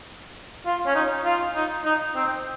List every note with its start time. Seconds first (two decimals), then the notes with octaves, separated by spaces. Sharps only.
0.66 F4
0.86 C#4
0.95 D#4
1.25 F4
1.55 D#4
1.85 D#4
2.15 C4